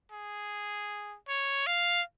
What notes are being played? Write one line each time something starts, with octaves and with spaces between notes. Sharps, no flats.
G#4
C#5
F5